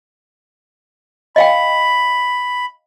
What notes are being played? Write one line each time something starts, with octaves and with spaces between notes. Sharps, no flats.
D#5 F5 G5 B5